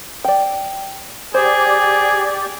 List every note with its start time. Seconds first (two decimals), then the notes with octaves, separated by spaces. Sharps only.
0.25 D5 G5
1.34 G4 G#4 C5 D5